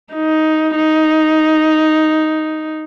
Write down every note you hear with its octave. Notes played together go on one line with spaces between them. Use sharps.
D#4
D#4